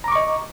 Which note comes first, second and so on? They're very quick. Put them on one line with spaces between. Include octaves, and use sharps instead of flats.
A#5 D6 C#6 D#5